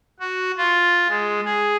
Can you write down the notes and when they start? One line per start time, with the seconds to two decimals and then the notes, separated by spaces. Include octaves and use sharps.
0.20 F#4
0.57 F4
1.08 G#3
1.45 G#4